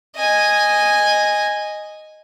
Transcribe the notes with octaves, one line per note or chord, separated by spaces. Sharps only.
D#5 G#5